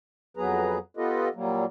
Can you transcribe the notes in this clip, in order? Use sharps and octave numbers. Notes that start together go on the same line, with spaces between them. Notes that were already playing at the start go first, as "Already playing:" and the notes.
F2 F#3 B3 G#4 B4 A#5
B3 F4 G4 A4 B4 D#5
A#2 F#3 G3 A#3